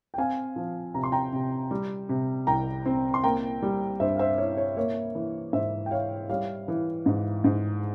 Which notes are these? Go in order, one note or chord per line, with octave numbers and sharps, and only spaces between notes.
G5
C4 F5 G#5
F3
C3 A#5
C6
G5 A#5
C3
G3
C3
C2 G5 A#5
C4
C6
A#3 G5 A#5
G3
G2 C5 E5
F5
C5 E5
E4 C#5
C#5
A#3 C#5
E3
G#2 C5 E5
G5
E4 C#5 F5
G3 C#5 F5
E3
G#2
G#2